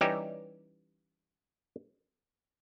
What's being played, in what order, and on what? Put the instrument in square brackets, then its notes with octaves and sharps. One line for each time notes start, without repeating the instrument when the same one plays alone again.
[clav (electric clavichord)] E3 G3 C#4 D#4 G4 E5